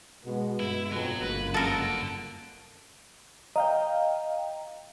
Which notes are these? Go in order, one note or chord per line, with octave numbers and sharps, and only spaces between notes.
B2 G#3 B3
G2 G#3 E4
F2 B2 F#3
G1 C#2 F#2 A#3 B4
A4 A#4 F#5 A5
D#5 F5 G5 A#5